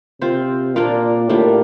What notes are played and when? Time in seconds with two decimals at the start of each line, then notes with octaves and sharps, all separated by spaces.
0.21 C3 C4 F4 C5
0.75 A#2 A#3 D4 F4 A#4
1.29 A2 G3 A#3 D4 F4